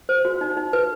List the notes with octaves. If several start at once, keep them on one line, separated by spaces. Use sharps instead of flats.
C5
F#4
D#4
D#4
B4